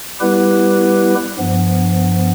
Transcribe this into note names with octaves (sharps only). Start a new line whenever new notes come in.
G3 B3 E4 G4 B4
G2 F3 B3